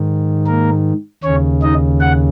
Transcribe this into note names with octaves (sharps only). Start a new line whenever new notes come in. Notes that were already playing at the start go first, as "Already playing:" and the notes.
Already playing: G#2 D#3
A#3 A#4
D#2 C#3 C#4 C#5
D#4 D#5
F#5